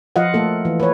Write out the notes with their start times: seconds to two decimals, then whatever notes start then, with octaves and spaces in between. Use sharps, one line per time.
0.16 F3 F4 D#5 F5 F#5
0.34 A3 A#3 A4
0.65 E3
0.80 B4 C#5